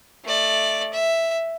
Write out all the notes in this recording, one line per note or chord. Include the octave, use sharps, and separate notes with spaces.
A3 D5
E5